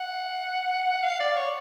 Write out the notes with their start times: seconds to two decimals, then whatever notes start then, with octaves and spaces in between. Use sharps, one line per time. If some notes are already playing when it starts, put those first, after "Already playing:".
Already playing: F#5
1.03 F5
1.20 D5
1.37 C#5